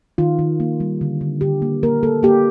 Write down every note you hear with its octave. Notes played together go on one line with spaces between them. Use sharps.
D#3 F4
D#3
A#3
G3
D3
D3
D3 G4
A#3
A#3 A#4
A#3 A4
A#3 G4